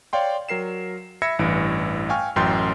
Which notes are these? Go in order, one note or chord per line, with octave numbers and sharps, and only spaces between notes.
C#5 D5 F5 G5 C6
F#3 A#4 C7 E7
E5 B5 E6 G#6 A#6 C#7
A1 G2 E3 D7
F5 G5 G#5 C#6 F6
A1 F#2 G5 C6 G6 A6